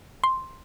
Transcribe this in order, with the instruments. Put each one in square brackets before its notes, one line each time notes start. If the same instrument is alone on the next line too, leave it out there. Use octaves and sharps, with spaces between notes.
[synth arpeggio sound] C6